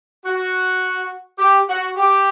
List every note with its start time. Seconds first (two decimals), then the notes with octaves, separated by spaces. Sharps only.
0.24 F#4
1.38 G4
1.68 F#4
1.97 G4